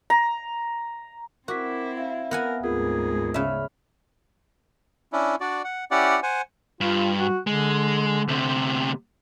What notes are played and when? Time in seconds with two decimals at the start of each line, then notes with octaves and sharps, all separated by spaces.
0.10 A#5
1.48 C4 E4 F#4 A#4 D6 B6
1.97 E5 F5
2.31 B3 A#4 F#5 G#5
2.64 D2 G#2 C4 F4 G#4 A#4
3.34 C#3 D5 E5 B5 F6
5.13 C#4 D4 E4
5.41 D4 F#4 D5
5.64 F#5
5.91 C#4 E4 G4 D5 F#5
6.23 C5 F#5 G#5
6.81 G2 F4
7.19 F#4
7.47 D3 G#3
8.28 D2 C3